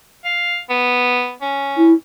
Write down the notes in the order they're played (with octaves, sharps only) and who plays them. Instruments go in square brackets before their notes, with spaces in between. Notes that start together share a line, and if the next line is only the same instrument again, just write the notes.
[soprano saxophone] F5
B3
C#4
[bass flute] E4